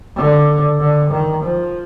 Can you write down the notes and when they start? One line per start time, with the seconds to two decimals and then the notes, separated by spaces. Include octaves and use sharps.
0.16 D3
0.80 D3
1.11 D#3
1.43 F3